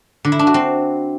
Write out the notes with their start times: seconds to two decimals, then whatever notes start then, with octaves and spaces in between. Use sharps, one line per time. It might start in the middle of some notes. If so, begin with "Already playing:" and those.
0.25 D3
0.32 E4
0.39 D4
0.47 F#4
0.54 C4